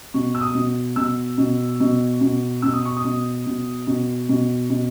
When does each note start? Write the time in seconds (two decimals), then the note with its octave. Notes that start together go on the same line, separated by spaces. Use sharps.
0.14 B2 C#6
0.35 E6
0.41 D#6
0.55 B2
0.96 B2 E6
1.38 B2
1.80 B2
2.21 B2
2.62 B2 E6
2.73 D#6
2.85 C#6
2.97 D#6
3.05 B2
3.46 B2
3.87 B2
4.29 B2
4.70 B2